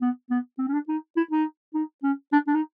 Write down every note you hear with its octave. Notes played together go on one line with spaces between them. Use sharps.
B3
B3
C4
C#4
D4
D#4
E4
D#4
D#4
C#4
D4
D4
D#4